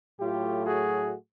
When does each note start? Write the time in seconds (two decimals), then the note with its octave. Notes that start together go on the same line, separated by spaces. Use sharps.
0.20 A2 F#3 A3 F4 G4
0.66 F#4 G#4